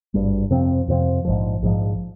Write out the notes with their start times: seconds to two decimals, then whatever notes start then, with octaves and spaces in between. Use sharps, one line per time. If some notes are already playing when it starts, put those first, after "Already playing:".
0.14 G#1 G2 G3
0.51 F2 C3 F3 C4
0.88 F2 C3 F3 C4
1.25 A#1 G#2 F3
1.63 A#1 G#2 F3